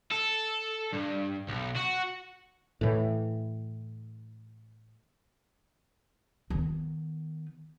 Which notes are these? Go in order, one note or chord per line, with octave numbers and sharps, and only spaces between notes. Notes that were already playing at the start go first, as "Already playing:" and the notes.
A4
G2
B1
F#4
A2 E3
D#3 B3